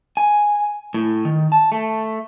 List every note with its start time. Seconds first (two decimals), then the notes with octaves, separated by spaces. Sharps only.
0.17 G#5
0.94 A2
1.25 D#3
1.52 A5
1.72 A3